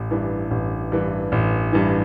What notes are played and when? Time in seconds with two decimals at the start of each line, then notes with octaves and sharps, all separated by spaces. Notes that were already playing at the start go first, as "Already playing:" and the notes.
Already playing: A1
0.11 G2 E3
0.51 A1
0.92 G2 E3
1.32 A1
1.73 G2 E3